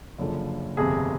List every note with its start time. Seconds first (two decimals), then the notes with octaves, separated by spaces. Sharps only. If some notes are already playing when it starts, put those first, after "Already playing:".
0.18 F#1 F#2 D3 F3
0.77 G1 F2 C3 G#4